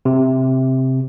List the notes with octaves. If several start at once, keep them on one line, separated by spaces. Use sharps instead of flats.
C3